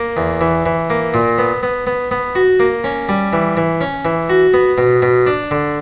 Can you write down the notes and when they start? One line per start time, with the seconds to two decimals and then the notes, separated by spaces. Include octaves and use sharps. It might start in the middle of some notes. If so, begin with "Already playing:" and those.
Already playing: A#3
0.17 E2
0.41 E3
0.66 E3
0.90 A#3
1.14 A#2
1.38 B3
1.63 B3
1.87 B3
2.11 B3
2.35 F#4
2.60 A#3
2.84 C#4
3.09 G3
3.33 E3
3.57 E3
3.81 C#4
4.05 E3
4.29 F#4
4.54 B3
4.78 B2
5.02 B2
5.26 D4
5.51 D3